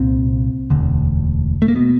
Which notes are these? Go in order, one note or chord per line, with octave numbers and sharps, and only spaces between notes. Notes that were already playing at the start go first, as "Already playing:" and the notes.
Already playing: C2 A#2 C4
E1 D2 D3
A3
A#3
B2 B3